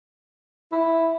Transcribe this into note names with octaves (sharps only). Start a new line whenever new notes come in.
E4